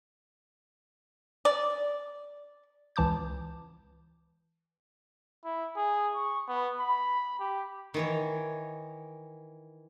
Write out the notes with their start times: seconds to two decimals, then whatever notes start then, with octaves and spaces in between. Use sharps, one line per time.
1.45 D5
2.96 C#2 E3 A5 D6 G6
5.45 E4
5.77 G#4
6.15 C#6
6.48 B3
6.80 B5
7.40 G4
7.94 D#3 E3 C#5